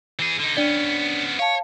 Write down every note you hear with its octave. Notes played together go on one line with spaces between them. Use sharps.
E3 G#4
D3 D#4
B3 C#4 D4 D5 G7
C#5 F5 A5